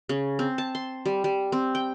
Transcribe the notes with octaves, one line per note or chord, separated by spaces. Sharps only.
C#3
C4
A5
C6
G3
G3
C4
G5